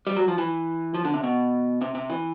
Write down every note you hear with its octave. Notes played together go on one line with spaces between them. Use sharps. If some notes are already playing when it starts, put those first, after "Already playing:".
G3
F#3
F3
E3
F3
D3
C3
B2
C3
C3
E3